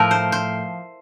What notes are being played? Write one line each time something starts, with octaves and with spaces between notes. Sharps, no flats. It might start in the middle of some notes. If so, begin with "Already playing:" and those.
Already playing: A2 F3 A3 A#4
C5
C5